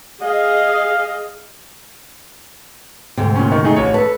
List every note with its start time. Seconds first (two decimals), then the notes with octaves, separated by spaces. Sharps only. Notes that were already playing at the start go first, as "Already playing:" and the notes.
0.23 G#4 D#5 F5
3.17 D2 G#2 C3
3.35 A#2 C#4
3.52 D#3 C#6
3.64 A3 D#4 G#4
3.76 A1 C#5
3.94 A4 B4 A5